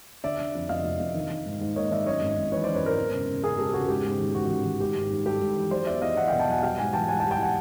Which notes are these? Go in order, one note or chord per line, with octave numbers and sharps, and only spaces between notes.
D3 D5 E5
D3
F2
F1 D#5 F5
F1
F1
D#3
D#3
G#2
G#2
A#3 C#5 D#5
D#3 D5 E5
F#2 C#5 D#5
G#1
G#1
E3 B4 C#5
F#2 C5 D5
B4 C#5
G#1 A#4 C5
E1
C#3
C#3
C#3 G#4 A#4
E1 G4 A4
C#3 F#4 G#4
G#2 G4
G#2
D#3
A1 F#4
D#3
D#3
G#2 G4
G#2
G#2
G3 G4 A4
G#2
E3
F#3 C5 D5
E2 D5 E5
E2 D#5 F5
E2 E5 F#5
B2 F5 G5
G5 A5
F#3 F#5 G#5
G3 F5 G5
G#2 F#5 G#5
E3 G5 A5
G3 F#5 G#5
G5 A5
G3
G5 A5
E3 F#5 G#5